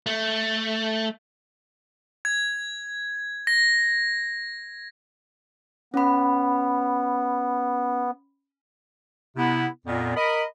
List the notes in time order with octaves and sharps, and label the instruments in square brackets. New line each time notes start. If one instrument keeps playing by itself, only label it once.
[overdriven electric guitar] A3
[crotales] G#6
A#6
[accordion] B3 [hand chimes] C#4 B5
[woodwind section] C3 B3 E4
F2 A#2 B3
A#4 D#5 B5